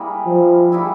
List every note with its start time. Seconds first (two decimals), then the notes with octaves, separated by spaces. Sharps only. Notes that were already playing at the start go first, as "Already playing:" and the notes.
Already playing: G3 A#3 E4 G#4
0.26 F3
0.72 G3 A#3 E4 G#4